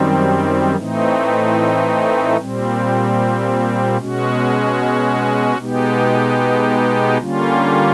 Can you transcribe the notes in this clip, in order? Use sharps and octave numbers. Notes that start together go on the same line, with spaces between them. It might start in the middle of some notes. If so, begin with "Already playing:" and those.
Already playing: F#2 D#3 G3 C4
A2 E3 A3 C4 D#4
A#2 G3 C4
B2 G#3 C#4 F#4
B2 G#3 B3 D#4 G4
D3 G3 A#3 C#4 F4